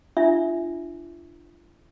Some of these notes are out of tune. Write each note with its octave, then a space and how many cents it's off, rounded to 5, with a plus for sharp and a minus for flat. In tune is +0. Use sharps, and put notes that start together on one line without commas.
D4 +20 F4 -30 E5 +0